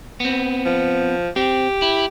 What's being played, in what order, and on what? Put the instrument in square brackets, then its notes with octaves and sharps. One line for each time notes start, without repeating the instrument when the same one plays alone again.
[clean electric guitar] B3 C4
[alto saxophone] F3
[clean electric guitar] C4 [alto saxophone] G4
[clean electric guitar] E4